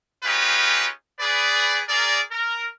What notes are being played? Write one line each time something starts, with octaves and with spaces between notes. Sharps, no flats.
C#4 D#4 F4 G4 G#4 B4
G#4 B4 D5
G#4 A#4 D5
A#4